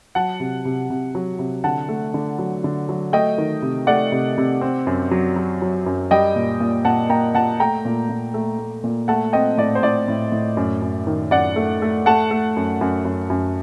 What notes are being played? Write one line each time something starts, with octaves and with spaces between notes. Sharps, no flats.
F#3 F#5 A5
C3
C3
C3
F#3
C3
D3 F#5 A5
A3
D3
F#3
D3
F#3
A3 D#5 G5
D#3
C3
A3 D5 F#5
C3
C3
C4
F#2
F#3
F#3
F#3
F#2
G3 D#5 G5
A#2
A#2
A#2 F#5 A5
A#3 G5 A#5
A#2 F#5 A5
A3 G5 A#5
A#2
A#2
A3
A3
A#2
A3 F#5 A5
C4 D#5 G5
A2 D5
C5
A2 D5
A2
A2
F#2
F#2
D#3
F#2 D5 F#5
A3
A3
A3 F#5 A5
A3
F#2
F#2
F#2
F#2